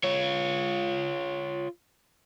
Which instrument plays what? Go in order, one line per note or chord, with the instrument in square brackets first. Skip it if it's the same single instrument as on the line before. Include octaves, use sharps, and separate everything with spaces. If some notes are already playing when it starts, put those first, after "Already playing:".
[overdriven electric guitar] F4 C#5